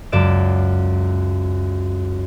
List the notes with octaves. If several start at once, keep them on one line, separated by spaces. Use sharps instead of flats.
C#2 F#2 D5 E7